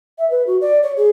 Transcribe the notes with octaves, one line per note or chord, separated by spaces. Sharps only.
E5
B4
F#4
D5
C#5
G#4